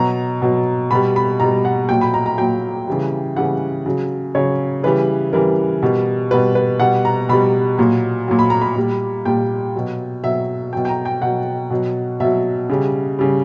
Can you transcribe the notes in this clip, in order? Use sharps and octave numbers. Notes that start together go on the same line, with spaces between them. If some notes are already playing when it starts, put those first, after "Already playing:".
Already playing: B2 F#3 A#5
B2 F#3
B2 G3 B5
B5
B2 G3 A#5
F#5
A#2 F#3 G5
B5
A#5
A#5
A#2 F#3 G5
C#3 E3 G3
C#3 E3 G3 F#5
C#3 F#3
C#3 F#3 C#5
C#3 E3 G3 B4
C#3 E3 G3 A#4
B2 G3
B2 G3 B4
B4
B2 G3 F#5
A#5
B2 G3 B5
A#2 F#3
A#2 F#3
B5
A#5
B5
A#2 G3
A#2 G3 G5
B2 F#3
B2 F#3 E5
B2 F#3 G5
G5
A#5
G5
B2 F#3 F#5
B2 F#3
B2 F#3 E5
C#3 G3
C#3 G3